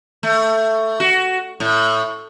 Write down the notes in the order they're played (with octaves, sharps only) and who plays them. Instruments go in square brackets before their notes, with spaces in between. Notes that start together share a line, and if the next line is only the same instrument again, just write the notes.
[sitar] A3
F#4
A2